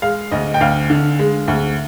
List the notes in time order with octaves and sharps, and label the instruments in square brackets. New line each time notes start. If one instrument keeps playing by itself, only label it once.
[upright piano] G#3 F5
D2 D#5
G5
D2 F5
D3
G#3
D2